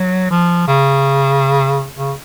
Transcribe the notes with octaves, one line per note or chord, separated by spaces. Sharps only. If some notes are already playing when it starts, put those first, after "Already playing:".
Already playing: F#3
F3
C#3
C#3